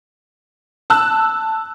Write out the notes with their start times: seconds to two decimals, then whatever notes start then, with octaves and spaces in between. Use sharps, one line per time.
0.90 A5 E6 F#6